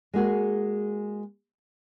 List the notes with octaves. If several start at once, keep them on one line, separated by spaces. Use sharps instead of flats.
G#3 A#3 F#4 G#4